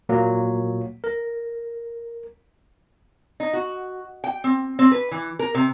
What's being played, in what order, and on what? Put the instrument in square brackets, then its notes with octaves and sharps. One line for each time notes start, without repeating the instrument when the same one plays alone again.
[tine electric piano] A#2 F#3 A#3
A#4
[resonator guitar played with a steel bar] D#4
F#4
G5
C4
C4
B4
E3
A#4
C3